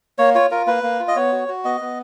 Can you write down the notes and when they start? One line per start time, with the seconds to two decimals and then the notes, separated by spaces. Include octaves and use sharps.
0.18 A#3 C#5
0.35 F4 C#5
0.51 F4 A#4
0.67 A#3 B4
0.83 A#3
0.99 F4
1.08 D#5
1.16 B3 C#5
1.32 F#4
1.48 F#4
1.65 B3 D#5
1.81 B3